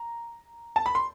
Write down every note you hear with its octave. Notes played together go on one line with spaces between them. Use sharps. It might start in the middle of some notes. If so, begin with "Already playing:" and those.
Already playing: A#5
A5
B5
C6